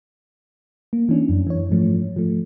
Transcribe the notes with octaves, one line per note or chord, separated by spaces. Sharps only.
A#3
E3 C#4 D4
F#2
E3 C#5
G#2 F3 A3
F3 A3